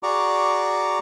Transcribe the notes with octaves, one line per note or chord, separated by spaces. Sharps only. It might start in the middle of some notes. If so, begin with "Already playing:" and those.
F#4 G#4 D5 A#5 C#6 D6